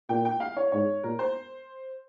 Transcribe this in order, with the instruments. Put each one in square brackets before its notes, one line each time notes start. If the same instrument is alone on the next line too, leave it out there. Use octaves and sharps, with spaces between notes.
[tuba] A#2 [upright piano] G5
[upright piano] G5
F5
C#5
[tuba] G#2 [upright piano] C#5
[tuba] A#2 [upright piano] A#4
[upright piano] C5